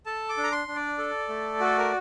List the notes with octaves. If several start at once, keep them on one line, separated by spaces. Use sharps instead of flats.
A4 A5
D6
D4
A#5
C6
D4
D5
A4
A3
F#4 A4
A#4